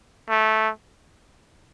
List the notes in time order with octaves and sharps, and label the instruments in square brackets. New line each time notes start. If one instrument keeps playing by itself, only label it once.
[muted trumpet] A3